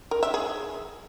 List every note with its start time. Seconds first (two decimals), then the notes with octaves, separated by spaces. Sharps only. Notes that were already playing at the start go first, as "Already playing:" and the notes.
0.11 A#4
0.23 E5
0.34 G#4